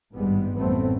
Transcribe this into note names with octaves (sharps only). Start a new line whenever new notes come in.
G#1 G2 G3 G#3 B3
A1 F#2 G3 A3 B3 C4